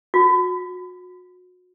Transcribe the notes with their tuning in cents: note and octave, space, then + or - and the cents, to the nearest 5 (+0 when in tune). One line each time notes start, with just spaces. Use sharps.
F#4 -30